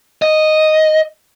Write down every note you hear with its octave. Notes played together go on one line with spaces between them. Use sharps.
D#5